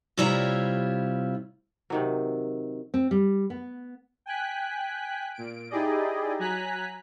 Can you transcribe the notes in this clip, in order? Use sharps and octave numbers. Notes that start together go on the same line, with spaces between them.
C3 G3 E4 F4 C#5 A#5
C3 D#3 F#3
C4
G3
B3
G5 G#5 F#6 B6
A#2 D7
D#4 E4 G4 G#4 D5 D#5
F#3 G#5 A#5 F#6 B6